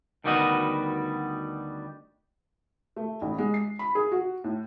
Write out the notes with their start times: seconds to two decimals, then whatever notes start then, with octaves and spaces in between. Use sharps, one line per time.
0.24 D2 D#3 G3 B3 F#4 D#5
2.96 A3
3.22 A1
3.38 G#3
3.54 C7
3.79 B5
3.95 G#4
4.12 F#4
4.44 A2